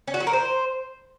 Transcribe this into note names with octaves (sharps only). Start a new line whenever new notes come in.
C#4
F#4
F#3
A#4
C5